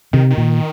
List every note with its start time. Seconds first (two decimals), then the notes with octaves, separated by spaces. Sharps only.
0.13 C3 D#3
0.30 D#3
0.37 A#2